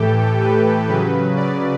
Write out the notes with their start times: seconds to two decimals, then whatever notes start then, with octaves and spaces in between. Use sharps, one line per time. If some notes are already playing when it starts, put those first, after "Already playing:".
Already playing: A2 E3 G4 A4 G5
0.40 B4
0.89 C#3 F#3 B4
1.37 D5